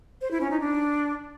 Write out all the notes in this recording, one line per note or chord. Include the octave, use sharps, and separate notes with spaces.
C5
E4
C#4
D#4
D4